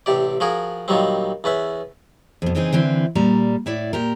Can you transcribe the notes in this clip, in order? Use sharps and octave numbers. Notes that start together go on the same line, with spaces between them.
A1 C3 G4 D5
F3 F#4 G#4 A#4
A#2 D#3 F#3 G3 C4
E2 C#4 B4 E5
F2 B2
C#3 E3 C4 D#4 F4 G#4
D3 E3 C4 E4
A#2 G3 A#5
A2 E4 D5
A#2 G4 A#4